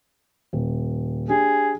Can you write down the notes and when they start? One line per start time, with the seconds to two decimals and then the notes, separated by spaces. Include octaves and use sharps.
0.53 D#1
1.29 D4 G4 G#4